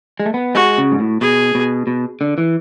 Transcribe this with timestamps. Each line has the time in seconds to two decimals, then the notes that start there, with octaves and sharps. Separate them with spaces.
0.20 G#3
0.26 A3
0.34 B3
0.55 G#3 F#4
0.78 C#3
0.92 G#2
1.00 A2
1.21 B2 G#4
1.55 B2
1.87 B2
2.21 D3
2.38 E3